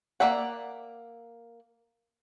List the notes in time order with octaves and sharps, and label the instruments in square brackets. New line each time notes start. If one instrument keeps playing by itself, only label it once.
[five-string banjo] A#3 D#4 D5 E5 F#5